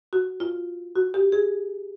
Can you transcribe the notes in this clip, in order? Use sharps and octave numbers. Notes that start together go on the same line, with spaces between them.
F#4
F4
F#4
G4
G#4